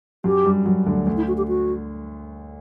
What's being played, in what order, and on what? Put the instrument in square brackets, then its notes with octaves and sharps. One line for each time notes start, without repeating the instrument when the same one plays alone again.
[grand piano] F#2 F#3 [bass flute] G4
[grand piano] G2 G3
F#2 F#3
D2 D3
D2 D3
[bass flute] E4
F#4
G4
F#4